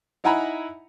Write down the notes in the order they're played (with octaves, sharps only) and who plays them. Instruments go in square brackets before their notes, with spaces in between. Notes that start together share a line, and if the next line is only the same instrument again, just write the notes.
[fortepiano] D#4 E4 F#5 G#5 A#5 B5